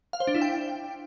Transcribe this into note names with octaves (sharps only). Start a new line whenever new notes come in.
F5
C5
D4
E4
G5